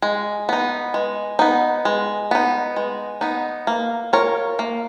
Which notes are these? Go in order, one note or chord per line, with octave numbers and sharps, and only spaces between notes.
G#3
B3 D#4
G#3
B3 D#4
G#3
B3 D#4
G#3
B3 D#4
A#3
F4 A#4 C#5
A#3